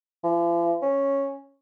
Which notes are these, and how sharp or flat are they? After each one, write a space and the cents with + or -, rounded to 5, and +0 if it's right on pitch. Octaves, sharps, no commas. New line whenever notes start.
F3 -45
C#4 -5